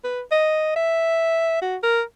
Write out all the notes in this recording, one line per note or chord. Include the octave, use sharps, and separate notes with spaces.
B4
D#5
E5
F#4
A#4